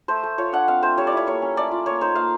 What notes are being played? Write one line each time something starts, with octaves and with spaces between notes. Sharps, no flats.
A3 C5
A3
F4 C#5
D4 F#5
C4 F5
A3 C5
G3 C#5
D5
E4 C#5
A#3 C#5
C#4
A3 D5
F4
A#3 C#5
D#4 C5
A#3 F5